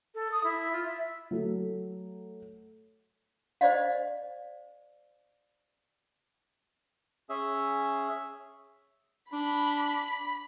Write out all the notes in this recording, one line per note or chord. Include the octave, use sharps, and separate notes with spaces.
A4
D#6
E4
F4
E5
F#3 A3
C5 D5 D#5 F5
C#4 G#4 E5
D4 B5